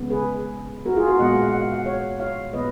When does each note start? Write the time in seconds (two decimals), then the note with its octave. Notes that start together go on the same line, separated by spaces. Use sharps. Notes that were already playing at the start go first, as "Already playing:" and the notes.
Already playing: C#3 G#3 B3
0.10 G#4 B4
0.85 F#4 A#4
0.97 F4 G#4
1.08 F#4 A#4
1.19 A#2 G#3 B3 D#5 F#5
1.36 F5
1.48 F#5
1.61 F5
1.74 F#5
1.86 C#5 F5
2.20 C#5 F5
2.53 A#2 F3 B3 B4 D#5